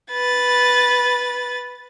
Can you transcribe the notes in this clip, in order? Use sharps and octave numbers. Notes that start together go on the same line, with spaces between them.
B4 A6